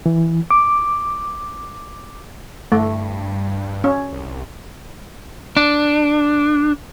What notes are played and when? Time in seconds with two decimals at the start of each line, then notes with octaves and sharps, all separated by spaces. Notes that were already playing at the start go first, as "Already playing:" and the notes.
0.06 E3
0.51 D6
2.72 G2 A3
3.84 C#4
4.13 C2
5.57 D4